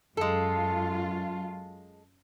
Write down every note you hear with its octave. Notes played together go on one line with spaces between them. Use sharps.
F#2 G#3 F4 A4